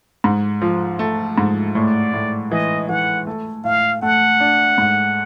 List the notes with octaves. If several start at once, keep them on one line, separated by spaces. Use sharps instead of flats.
G#2
F3
A3
G#2
A2 D5
A2
E3 D#5
E3 F#5
A3
A2 F5
A3 F#5
D4
G#2